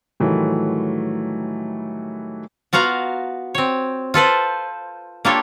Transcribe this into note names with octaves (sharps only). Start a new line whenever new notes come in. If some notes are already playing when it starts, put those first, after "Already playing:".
A2 D#3 E3 F#3 G3 A3
B3 F4 F#4 F5 A#5
C4 C#5
F4 A4 B4 C5
A#3 D4 F4 G4 A4 C#5